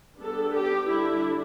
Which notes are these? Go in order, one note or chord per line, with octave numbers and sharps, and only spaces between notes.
G3 B3 D4 A4
G4
D3 G3 D4 E4